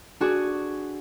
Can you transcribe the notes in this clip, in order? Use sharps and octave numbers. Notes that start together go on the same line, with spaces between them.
D4 F#4 G#4